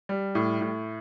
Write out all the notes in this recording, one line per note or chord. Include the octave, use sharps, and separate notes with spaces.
G3
A2
A2